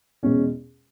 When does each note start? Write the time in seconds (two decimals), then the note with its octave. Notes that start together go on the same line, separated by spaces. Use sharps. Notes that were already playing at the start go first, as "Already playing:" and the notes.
0.23 E2 B2 G#3 C#4